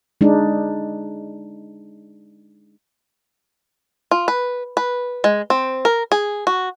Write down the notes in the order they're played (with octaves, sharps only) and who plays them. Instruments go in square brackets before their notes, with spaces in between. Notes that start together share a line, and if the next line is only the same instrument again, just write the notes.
[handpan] G#3 D4 D#4
[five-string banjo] F4
B4
B4
G#3
C4
A#4
G#4
F#4